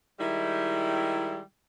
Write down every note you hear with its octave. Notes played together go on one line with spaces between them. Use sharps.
D#3 G3 G#3 E4